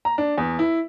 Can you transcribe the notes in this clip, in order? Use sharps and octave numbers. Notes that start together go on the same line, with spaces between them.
A#5
D4
E2
E4